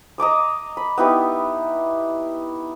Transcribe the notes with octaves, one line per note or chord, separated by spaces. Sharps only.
D#5 A#5 D6 D#6
B5
B3 D#4 E4 G4